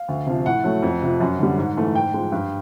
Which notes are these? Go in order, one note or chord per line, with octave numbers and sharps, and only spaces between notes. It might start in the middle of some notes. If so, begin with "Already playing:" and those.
Already playing: F5
D2
C3 F3
A2 F#5
F#3 A3
F2
C3 F3
F#2
D3 G3
G#2
E3 A3
G#2 G5
F3 G#3
G2